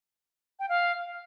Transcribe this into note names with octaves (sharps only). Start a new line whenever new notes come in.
G5
F5